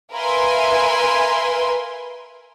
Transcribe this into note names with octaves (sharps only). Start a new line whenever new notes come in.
A#4 B4 E5 F5 G#5 C6